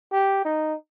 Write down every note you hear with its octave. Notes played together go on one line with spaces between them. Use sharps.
G4
D#4